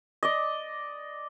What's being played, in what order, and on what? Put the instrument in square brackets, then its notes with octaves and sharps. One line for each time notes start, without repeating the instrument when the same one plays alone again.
[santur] D5 D#5